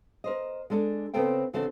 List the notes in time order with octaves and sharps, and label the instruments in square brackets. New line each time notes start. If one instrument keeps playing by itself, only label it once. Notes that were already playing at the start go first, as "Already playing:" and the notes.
[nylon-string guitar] A#4 C5 D#5
G#3 D4 A4 D5
C#3 B3 C4 A4 C5 G5
C#3 E3 C4 D4 F#4 A4